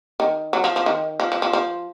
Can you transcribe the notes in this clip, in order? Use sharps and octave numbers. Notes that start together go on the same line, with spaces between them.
D#3
F#3
F3
F3
D#3
F3
F3
F3
F3